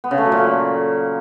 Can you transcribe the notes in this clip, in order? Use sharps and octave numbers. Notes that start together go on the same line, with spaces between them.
B3
C#3
A3
F#3
A#2